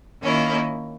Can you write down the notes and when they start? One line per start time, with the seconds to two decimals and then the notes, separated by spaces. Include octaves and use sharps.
0.22 D#3 A#3 C#4 E4